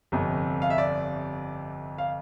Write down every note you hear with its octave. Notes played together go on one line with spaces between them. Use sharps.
G1 F2 C3
F5
E5
D5
F5